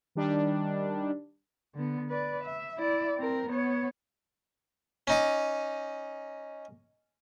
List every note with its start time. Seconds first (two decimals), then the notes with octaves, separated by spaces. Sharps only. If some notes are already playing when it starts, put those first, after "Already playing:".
0.15 D#3 G3 D4
1.75 D3 B3
2.09 B4 D5
2.43 E5
2.78 E4 D5
3.18 C4 A#4
3.48 B3 C#5
5.07 C#4 D#4 D6